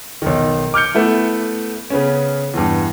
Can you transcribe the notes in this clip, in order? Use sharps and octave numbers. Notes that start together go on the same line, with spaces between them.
B1 D#3
D6 F6 G6 C#7
A3 B3 E4
C#3 B3 C#4
E2 G2